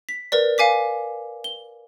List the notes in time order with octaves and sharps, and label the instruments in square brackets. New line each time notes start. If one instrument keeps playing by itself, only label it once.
[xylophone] B6
A#4 B4 D5
F5 G#5 D6 B6
G7